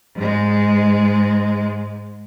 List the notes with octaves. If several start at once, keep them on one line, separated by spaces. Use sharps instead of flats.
G#2 G#3